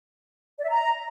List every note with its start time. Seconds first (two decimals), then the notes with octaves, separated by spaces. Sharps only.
0.58 D5
0.64 E5
0.69 A#5